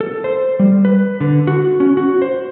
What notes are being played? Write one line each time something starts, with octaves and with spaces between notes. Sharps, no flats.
A4
C5
G3
B4
D3
F#4
C#4
F#4
C5